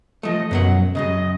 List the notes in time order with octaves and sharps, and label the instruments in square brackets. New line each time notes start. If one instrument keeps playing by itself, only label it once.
[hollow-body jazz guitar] F3 A3 [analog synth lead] D#5
[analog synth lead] F#2 [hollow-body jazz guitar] B2 F#3 F#5
[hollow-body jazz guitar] F#2 A#2 C#3 [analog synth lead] D#5